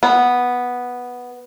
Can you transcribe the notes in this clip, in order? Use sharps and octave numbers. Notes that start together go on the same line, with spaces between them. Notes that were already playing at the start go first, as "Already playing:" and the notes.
B3